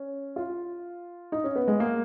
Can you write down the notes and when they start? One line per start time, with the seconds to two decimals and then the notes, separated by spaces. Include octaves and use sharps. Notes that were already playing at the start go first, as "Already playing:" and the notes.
Already playing: C#4
0.36 F4
1.32 D#4
1.44 C#4
1.56 B3
1.68 G#3
1.80 A#3